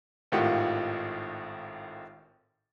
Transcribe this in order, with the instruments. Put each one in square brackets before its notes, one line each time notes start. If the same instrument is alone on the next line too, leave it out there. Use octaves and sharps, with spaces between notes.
[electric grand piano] G#1 A2 D#3 F4 G4 F#5